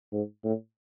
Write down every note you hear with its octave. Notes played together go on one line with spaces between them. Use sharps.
G#2
A2